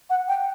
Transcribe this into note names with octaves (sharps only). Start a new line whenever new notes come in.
F#5
G5